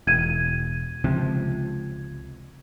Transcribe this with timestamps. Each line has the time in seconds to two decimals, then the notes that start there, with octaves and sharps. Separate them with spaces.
0.07 E1 G#6 D#7
1.04 C#2 C3 F3